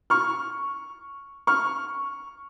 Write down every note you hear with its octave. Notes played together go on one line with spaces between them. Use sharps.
C#6 F6
C#6 F6